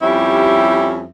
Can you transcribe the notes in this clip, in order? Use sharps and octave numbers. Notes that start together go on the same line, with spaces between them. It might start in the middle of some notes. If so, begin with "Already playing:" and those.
F2 G3 C#4 E4 G4 E5